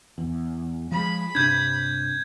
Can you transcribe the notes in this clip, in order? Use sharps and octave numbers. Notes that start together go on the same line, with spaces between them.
E2
F3 G#3 B5
G2 C3 D4 G6 G#6